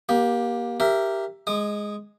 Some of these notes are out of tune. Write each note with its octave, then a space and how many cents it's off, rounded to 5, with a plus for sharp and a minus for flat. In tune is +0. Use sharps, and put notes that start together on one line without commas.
A#3 +25 G4 +0
G4 +0 A#4 -5 E5 +15
G#3 +0 D#6 -35